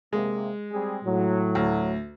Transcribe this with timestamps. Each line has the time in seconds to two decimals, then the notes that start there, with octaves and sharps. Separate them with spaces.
0.13 C3 G#3 A#3
0.72 G3 C4 G#4
1.05 A2 F#3
1.55 D2